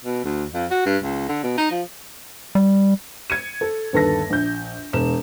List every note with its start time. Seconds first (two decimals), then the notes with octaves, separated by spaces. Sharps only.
0.04 B2
0.25 D2
0.53 F2
0.70 F#4
0.85 G2
1.03 C#2
1.29 D3
1.43 B2
1.58 D#4
1.71 F3
2.55 G3
3.30 G#6 C#7 D#7
3.61 A4
3.93 G1 D#2 A4 B4 A5 A#6
4.30 A#1 G6
4.93 E1 E7